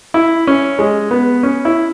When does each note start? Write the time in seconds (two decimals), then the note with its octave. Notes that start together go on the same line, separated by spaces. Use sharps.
0.14 E4
0.47 C#4
0.79 G#3
1.11 B3
1.43 C#4
1.65 E4